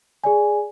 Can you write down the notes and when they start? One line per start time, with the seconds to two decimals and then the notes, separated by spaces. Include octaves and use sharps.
0.24 G#4 D5 G#5